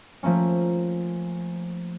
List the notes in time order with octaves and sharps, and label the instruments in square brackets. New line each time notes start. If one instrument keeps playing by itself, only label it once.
[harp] F3 A3 A#3 C#4